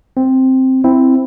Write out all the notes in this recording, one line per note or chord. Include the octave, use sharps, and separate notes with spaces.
C4
C4 E4